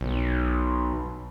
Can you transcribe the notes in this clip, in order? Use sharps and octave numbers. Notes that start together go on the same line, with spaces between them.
B1